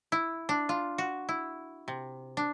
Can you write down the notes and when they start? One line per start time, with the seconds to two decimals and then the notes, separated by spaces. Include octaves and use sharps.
0.12 E4
0.49 D4
0.69 F4
0.98 F#4
1.29 E4
1.88 C3
2.37 D4